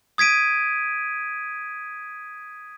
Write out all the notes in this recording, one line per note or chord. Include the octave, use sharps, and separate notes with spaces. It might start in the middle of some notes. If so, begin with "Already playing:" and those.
D#6 G#6 B6 D7 D#7